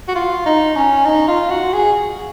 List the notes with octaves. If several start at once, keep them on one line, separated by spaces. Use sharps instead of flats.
F#4
F4
D#4
C#4
D#4
F4
F#4
G#4